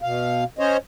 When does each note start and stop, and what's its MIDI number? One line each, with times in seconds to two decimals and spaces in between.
0.02 0.44 47
0.02 0.44 77
0.59 0.77 61
0.59 0.77 72
0.59 0.77 73
0.59 0.77 75